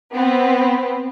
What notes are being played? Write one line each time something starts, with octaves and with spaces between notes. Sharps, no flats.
B3 C4 B4